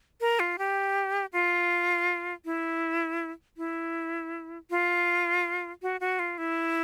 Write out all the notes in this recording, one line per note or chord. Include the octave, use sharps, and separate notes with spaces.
A#4
F4
G4
F4
E4
E4
F4
F#4
F#4
F4
E4